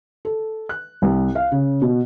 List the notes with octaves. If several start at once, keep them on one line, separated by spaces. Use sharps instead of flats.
A4
F#6
C2
F5
C#3
B2